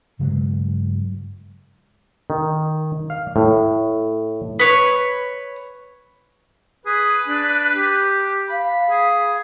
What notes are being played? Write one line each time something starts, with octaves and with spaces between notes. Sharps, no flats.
G2 C#3 F#3 G#3
D#3
F5
A2
B4 C#5
G#4 B4
D4
G4
F5 B5
G#4